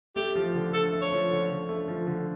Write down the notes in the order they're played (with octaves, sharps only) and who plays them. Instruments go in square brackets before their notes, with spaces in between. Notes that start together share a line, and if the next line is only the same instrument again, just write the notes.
[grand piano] A3 [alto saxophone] G4
[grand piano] F3
D3
[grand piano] D3 [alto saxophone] A4
[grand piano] A3
[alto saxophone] C#5
[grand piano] F3
D3
D3
A3
F3
D3